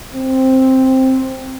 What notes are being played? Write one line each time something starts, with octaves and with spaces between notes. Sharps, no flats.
C4